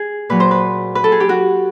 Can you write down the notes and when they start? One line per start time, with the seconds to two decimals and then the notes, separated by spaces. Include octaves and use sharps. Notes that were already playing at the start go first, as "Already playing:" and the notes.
Already playing: G#4
0.29 A#2 F#3 B4
0.40 C5
0.51 B4
0.95 B4
1.04 A4
1.12 G#4
1.20 G4
1.29 F#4